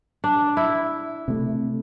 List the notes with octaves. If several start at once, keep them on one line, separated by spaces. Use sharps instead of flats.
D4
E4
C3 A3